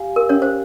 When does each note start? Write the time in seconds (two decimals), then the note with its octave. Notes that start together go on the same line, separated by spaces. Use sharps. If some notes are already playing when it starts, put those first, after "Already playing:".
Already playing: G4 F5 G#5
0.16 A#4
0.29 C#4 C#5
0.42 C5